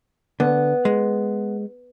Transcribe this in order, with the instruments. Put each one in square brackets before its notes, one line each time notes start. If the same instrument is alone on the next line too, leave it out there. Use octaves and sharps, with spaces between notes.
[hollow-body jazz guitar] D3 [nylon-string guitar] B3
[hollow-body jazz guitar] G#3